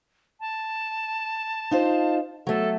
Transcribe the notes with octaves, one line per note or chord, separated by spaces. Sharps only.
A5
D#4 F4 C5
F#3 A3 A4